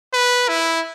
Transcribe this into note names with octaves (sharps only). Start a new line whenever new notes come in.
B4
E4